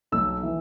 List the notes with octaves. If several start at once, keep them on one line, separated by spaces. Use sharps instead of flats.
B1 B2 F#3 E6
E3